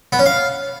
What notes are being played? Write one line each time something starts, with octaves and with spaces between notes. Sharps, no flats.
B3
C#4
F5